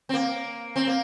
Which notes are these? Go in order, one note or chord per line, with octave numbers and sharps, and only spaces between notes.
C4
A#3
C4
A#3